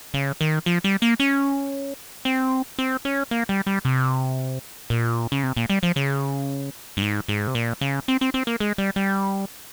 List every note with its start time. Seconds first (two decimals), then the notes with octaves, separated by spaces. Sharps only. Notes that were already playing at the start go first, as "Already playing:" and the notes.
0.14 C#3
0.41 D#3
0.66 F3
0.84 G3
1.02 A#3
1.20 C#4
2.25 C4
2.79 C4
3.05 C#4
3.31 A#3
3.49 G3
3.67 G3
3.85 C3
4.90 A#2
5.32 C#3
5.43 C3
5.57 A#2
5.70 G3
5.83 F3
5.96 C#3
6.97 G2
7.02 G#2
7.28 G#2
7.47 C3
7.55 A#2
7.81 C#3
8.08 C4
8.21 C4
8.34 C4
8.47 A#3
8.60 G#3
8.78 G3
8.96 G3